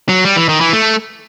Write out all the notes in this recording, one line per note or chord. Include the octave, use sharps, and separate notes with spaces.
F#3
G3
E3
D#3
E3
A3